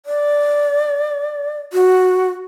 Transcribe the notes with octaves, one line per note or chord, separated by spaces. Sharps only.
D5
F#4